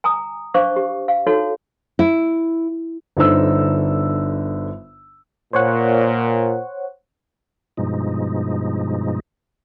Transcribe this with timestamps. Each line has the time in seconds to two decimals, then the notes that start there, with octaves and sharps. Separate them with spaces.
0.04 G#5 A#5 D#6
0.54 D4 C5 F5 C#6 D6
0.76 G4
1.08 F5
1.27 D#4 F#4 A4 C#5
1.99 E4
3.17 G1 D3 D#4 C5 E6
5.53 A#2 C5 C#5 F#5
7.77 G2 B2 F3 G#3 D#4